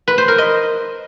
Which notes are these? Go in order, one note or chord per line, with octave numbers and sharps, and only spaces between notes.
B4
C5
A#4
D#5